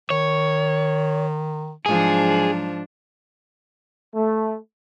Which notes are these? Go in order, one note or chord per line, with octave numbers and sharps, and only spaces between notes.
D#3 C#5
G#2 F3 F#3 D4 G#4
A3